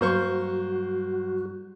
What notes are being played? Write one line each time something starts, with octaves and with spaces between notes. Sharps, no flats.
G2 F#3 G3 A#3 F#4 C5 C#6